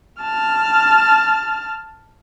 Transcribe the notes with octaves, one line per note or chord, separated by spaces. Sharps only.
A5 F6